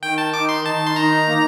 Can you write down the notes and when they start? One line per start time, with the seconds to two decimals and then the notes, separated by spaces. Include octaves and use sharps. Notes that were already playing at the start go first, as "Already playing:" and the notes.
0.03 D#3 G5
0.18 A5
0.34 D#4 D6
0.49 C6
0.65 D#3 A5
0.87 C6
0.96 D#4 A#5
1.28 A#3